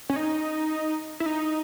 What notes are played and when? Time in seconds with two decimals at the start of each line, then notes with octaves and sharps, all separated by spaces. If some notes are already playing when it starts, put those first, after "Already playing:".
0.10 C#4
0.16 D#4
1.20 E4
1.26 D#4